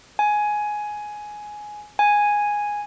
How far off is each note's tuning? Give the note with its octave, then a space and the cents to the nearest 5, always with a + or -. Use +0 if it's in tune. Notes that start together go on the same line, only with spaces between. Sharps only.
G#5 +10
G#5 -5